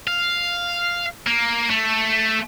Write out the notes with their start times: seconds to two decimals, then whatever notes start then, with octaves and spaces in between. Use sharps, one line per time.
0.07 F5
1.27 A#3
1.70 A3